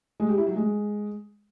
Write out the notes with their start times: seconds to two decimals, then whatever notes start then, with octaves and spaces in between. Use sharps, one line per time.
0.20 G#3
0.29 G4
0.38 E4
0.47 F#3
0.56 G#3